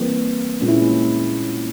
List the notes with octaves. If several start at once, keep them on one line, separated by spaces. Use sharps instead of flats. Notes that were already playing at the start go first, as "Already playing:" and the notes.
Already playing: E3 G3 A#3 C4
A#2 G#3 C#4
E4
C#4